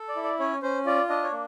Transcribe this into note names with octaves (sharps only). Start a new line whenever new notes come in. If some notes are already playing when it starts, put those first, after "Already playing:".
Already playing: A4
D5
E4
D5
C#4 C#5
C#4 C5
F4 D5
D4 D#5
C#5
A#3